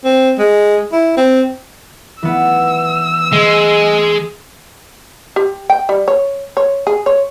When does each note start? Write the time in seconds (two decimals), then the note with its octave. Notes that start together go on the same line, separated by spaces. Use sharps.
0.04 C4
0.39 G#3
0.92 E4
1.17 C4
2.23 E3 B3 E6
3.33 G#3
5.36 G4
5.70 G5
5.89 G3
6.08 C#5
6.57 C#5
6.87 G#4
7.06 C#5